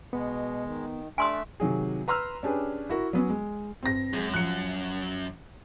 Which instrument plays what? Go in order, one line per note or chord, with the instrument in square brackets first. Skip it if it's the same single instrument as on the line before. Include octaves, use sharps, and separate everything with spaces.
[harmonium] B2 [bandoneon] G#3 [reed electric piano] B3
[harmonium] D#3
[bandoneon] A3 E5 [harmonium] D4 [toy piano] G#5 C6 D#6
[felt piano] C3 D#3 F#3 G#4
B4 A#5 C6 E6 F6
C#4 D4 G4 G#4 B4
E4 F#4 A#4
F#3 B3 C#4
G#3
[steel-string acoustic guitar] G2 [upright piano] C4 A#6
[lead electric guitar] F#2 [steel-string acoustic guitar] G#3 C#4 G#4
[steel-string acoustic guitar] F3 [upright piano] F#6 C#7